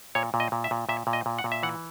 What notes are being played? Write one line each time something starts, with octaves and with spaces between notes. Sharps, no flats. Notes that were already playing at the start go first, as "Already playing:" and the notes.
A#2 C#5
A#2
D#5
A#2
E5
A#2
A#2 E5
A#2
D#5
A#2
F#5
A#2
E5
E3 F#5